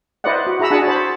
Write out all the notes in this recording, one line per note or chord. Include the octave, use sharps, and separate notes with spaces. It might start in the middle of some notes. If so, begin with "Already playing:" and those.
E4 B4 C5 D5 D#5 F#5
F#4
E4 G#4 A#5 B5 E6
D4 F#4 G#4 F#5 G#5 A5
C5 A5 B5